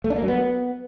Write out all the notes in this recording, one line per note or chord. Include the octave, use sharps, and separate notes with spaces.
A3
D4
A#3
F#3
B3